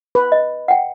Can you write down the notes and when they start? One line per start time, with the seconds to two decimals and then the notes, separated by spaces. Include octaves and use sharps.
0.15 B4
0.32 D#5
0.68 F#5 G5